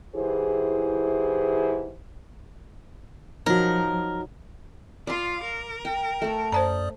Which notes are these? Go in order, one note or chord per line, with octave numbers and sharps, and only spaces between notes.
G#2 E3 E4 G4 G#4 C5
F3 F#3 D#4 A#4
F4 D5 F5 C6
A#4
G5
A3 A4
F#2 C5 D5 A5 A#5 D#6